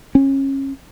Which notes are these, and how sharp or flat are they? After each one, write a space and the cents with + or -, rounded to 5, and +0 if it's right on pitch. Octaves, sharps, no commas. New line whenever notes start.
C#4 -25